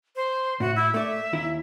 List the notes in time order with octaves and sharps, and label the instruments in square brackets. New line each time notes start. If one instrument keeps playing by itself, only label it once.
[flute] C5
[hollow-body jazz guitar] A2 [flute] F#4
[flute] E4
[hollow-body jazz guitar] A3 D5 [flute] E5
[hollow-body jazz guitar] D#2 E4